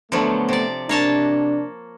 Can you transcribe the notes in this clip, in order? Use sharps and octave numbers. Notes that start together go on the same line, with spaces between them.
D3 F3 F#3 A3 B3
C3 D5
C3 A#3 D4 C#5 A5